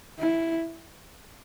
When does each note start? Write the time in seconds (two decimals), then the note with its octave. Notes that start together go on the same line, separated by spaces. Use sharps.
0.19 E4